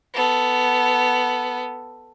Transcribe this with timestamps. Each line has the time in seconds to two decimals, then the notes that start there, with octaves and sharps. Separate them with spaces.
0.14 B3 A4